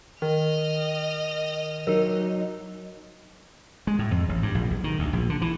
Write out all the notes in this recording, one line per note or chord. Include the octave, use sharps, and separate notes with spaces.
D#3 D#5 F6
F#3 D#4 A#4
G#3
A2
F2
A1
G2
A#1
B1
D#3
D2
A#1
D3
E3